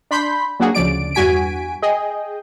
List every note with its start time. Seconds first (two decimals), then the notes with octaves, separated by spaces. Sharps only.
0.11 D4 B5 C6 G6 B6
0.60 F#3 A#3 D4 F#4 G#4
0.75 D2 C#3 F3 D5 D7
1.15 E2 G2 F#4 G#5 B6 D7
1.82 G#4 D#5 G5